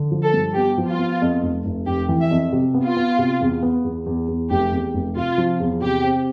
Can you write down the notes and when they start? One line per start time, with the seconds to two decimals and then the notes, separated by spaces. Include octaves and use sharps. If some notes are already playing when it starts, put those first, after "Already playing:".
Already playing: D3
0.11 F3
0.23 A4
0.33 G2
0.55 B3 G4
0.78 F3
0.88 F4
0.99 B3
1.22 F2
1.43 F1
1.65 F1
1.86 F1 G4
2.09 E3
2.20 E5
2.31 F2
2.53 C3
2.74 B3
2.85 F4
2.97 B3
3.19 C3
3.41 E2
3.63 B3
3.84 E2
4.06 E2
4.28 E2
4.49 F1 G4
4.72 E2
4.94 F1
5.16 C3 F4
5.38 F3
5.60 E2
5.81 C3 G4
6.04 C4